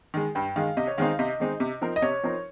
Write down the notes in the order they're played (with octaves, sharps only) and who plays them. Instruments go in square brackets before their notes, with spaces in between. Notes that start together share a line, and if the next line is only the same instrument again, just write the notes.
[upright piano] D#3 G#3
[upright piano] G2 [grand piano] G5
[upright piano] D#3 G#3 [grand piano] F5
[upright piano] C3 [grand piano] D#5
[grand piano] C#5
[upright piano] D#3 G#3 C4 D#4 [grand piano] F5
[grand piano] F5
[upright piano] C3 [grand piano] D#5
[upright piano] D#3 G#3 C4 D#4
C3
F3 C4 D#4 A#4
[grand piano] D#5
[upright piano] C3 [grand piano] C#5
[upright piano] F3 C4 D#4 A#4